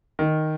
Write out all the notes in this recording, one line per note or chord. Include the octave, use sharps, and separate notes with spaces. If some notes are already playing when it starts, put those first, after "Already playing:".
D#3